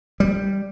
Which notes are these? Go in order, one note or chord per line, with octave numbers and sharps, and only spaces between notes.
G3